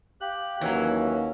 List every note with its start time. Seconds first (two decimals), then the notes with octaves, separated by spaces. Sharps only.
0.21 G4 F5 F#6
0.61 D#2 E3 F#3 C#4 F5